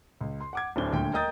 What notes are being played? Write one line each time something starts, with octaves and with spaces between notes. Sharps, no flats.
C#2
C6
F#5 D6 G#6
D1 A2 C4 D4 G7
D#1 D2 D3 G5
A#4 D#5 G5 D#6 G6 A6